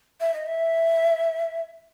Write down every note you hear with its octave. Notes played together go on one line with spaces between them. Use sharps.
E5
D#5
E5